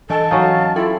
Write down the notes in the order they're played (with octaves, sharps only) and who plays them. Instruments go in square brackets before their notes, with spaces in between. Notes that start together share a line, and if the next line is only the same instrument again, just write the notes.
[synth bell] E3 D#5 G#5 [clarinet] A4 [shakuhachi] A5
[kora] F#3 C#4 D#4 [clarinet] F5
[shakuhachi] E4 [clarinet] F4 [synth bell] A4 G5